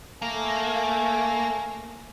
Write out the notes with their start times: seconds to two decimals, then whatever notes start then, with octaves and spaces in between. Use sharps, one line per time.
0.22 A3 A#3 G#5